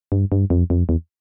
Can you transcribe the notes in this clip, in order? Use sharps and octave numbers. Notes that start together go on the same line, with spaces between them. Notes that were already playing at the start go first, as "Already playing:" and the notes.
G2
G2
F2
F2
E2